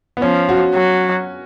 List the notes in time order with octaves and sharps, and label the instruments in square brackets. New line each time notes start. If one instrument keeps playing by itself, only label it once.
[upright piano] B3
[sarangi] F3 [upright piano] C#4
[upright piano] F#4
[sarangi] F#3